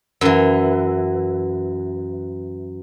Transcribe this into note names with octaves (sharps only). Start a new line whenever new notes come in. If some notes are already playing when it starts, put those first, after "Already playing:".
F#2 E3